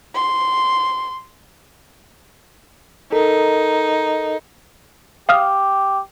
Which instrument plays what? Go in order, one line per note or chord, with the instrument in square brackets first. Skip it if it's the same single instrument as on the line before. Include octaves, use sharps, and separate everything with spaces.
[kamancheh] C6
[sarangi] D#4 [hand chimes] A4 A#4
[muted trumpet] G4 [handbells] F5 D#6 F6